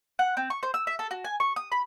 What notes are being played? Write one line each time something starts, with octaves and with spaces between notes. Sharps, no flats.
F#5
C4
C#6
C5
E6
E5
A4
F#4
G#5
C#6
D#6
B5